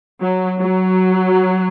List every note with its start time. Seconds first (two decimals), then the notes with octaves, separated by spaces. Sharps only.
0.21 F#3
0.59 F#3